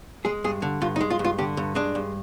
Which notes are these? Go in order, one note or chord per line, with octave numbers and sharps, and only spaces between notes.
G#3 G#4
G2 G#4
D3
G2 F4
D#4
G#3
F4
G2
F4
D3 G4
G2
G#3 D4
G2